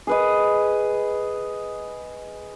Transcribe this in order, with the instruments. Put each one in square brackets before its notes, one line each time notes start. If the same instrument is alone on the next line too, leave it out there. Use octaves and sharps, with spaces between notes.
[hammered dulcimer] G#4 B4 D#5